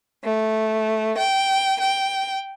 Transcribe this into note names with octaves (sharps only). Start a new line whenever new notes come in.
A3
G5
G5